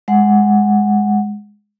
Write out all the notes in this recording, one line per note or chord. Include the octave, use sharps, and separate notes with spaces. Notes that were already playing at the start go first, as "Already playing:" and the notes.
G#3 F#5